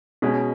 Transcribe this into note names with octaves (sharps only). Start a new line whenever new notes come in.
B2 G#3 C#4